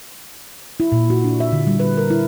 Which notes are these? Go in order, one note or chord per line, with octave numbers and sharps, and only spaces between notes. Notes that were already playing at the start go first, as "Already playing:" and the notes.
E4
A#2
F#4
D4
E5
D3
G3
B4
A#4
E4